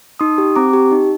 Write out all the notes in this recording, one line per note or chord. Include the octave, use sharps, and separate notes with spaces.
D#4 C6 D#6
G4
C4 A#5 D6
G4
D#4